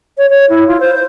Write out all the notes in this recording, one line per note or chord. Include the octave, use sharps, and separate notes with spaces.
C#5
C#5
E4
F4
C5
C5